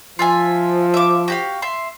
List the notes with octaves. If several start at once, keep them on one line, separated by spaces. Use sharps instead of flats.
F3 F4 E5 G#5
E5 D6
F#4 G4 F5
E5 C6